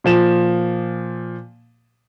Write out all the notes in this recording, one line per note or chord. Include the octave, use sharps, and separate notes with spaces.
A#2 F3 E7